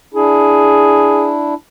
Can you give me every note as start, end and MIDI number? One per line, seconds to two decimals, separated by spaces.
0.14 1.54 62
0.14 1.54 64
0.14 1.31 68